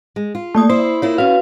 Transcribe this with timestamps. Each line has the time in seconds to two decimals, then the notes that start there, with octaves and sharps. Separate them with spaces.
0.16 G#3
0.35 F4
0.55 A3 A#3 D5 D#6
0.70 E4 C5
1.02 A#3 E4 F4 C#5
1.18 B3 C#4 F#4 B4 F5